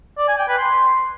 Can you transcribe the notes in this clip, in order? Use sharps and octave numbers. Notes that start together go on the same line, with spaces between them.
D5
G#5
G5
B4
C6